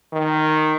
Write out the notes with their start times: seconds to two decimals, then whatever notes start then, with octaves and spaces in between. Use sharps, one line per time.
0.13 D#3